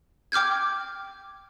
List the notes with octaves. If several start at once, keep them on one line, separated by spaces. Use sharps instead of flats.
G5 D6 F6 G6 G#6